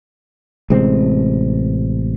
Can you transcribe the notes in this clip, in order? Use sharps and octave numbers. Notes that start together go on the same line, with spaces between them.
A1 C3 G#3 C4